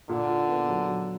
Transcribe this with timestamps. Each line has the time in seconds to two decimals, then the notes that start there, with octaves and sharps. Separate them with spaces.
0.09 A#2 D3
0.29 A#2
0.49 B3
0.69 F#3
0.88 F#3